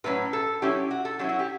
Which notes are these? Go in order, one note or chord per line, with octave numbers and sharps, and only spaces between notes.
A2 F#3 C#4 B4
A4
F#3 C#4 E4 G4
F#4
A4
F#3 C#4 E4 G4
F#4
G4